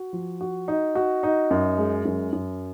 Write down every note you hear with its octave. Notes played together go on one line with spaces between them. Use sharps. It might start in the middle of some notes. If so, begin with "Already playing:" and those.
Already playing: F#4
F3
F#4
D#4
F#4
D#4
F#2
G#3
F#2
F#2